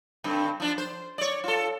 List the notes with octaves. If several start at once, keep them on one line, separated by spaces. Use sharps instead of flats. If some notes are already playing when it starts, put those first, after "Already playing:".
G2 D3 C4
F3 D4
C5
C#5 D5
F4 A4